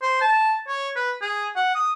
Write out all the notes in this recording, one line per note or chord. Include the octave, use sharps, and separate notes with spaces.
C5
A5
C#5
B4
G#4
F#5
D#6